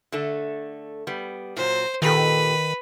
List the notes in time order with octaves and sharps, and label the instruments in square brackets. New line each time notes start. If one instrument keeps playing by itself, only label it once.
[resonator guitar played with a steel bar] D3 A3 A4
G3 B3
[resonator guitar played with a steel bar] A#2 F#3 [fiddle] C5
[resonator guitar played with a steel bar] A#2 G4 A4 [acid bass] D#3 [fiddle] B4